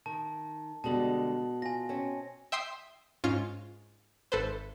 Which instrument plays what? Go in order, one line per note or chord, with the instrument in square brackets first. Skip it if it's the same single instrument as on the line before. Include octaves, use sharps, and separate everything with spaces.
[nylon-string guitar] D#3 [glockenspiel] A5
[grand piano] B2 [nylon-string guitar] D3 G3 G#3 [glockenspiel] A5 F#7
[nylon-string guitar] F4 [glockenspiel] G#5 A#6
[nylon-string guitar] C4 C#4
[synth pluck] E5 G5 C6 D#6 C7
G#2 C#4 F4 C#7
G#1 A4 B4 C5